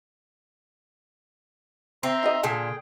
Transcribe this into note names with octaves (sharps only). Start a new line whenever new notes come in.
C4 E5 A#5 C6
D#4 F#4 D#5
A#2 D3 G#4 A4 G5